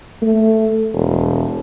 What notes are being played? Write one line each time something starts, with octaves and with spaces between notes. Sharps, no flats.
A3
E1